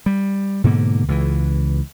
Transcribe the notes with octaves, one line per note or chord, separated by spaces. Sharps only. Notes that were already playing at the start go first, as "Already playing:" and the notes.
G3
G#2 B2 D3 A#3
C#2 E3